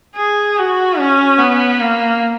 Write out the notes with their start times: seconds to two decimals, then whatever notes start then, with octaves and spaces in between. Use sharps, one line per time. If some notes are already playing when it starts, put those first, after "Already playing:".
0.16 G#4
0.57 F#4
0.98 C#4
1.38 B3
1.80 A#3